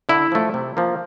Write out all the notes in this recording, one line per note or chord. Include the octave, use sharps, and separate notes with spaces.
D3 E4
F3 A3
C3
F3 A#3